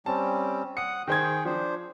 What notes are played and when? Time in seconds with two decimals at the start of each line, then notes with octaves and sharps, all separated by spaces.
0.06 G3 C4 C#4 A5
0.77 F#5 D#6 C#7
1.08 D#3 G#4 C5 G5 G#6
1.45 F3 D4 C5